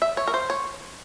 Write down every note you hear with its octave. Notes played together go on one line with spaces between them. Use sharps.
E5
C#5
A#4
C5
C#5